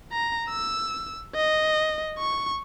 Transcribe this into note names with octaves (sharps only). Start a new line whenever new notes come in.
A#5
E6
D#5
C#6